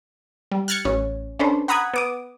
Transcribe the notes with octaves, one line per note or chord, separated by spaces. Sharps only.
G3
F6 F#6 G#6 A6 C#7
A1 C#4
C#4 D4 A4 B4 C5
F#5 A#5 B5 D#6 F#6 G#6
B3 D6 D#6